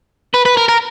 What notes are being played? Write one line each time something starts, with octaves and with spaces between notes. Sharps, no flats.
B4
B4
A#4
A#4